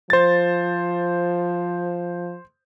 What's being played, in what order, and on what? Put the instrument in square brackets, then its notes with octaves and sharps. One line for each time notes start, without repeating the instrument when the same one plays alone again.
[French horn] F3 [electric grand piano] C5 A6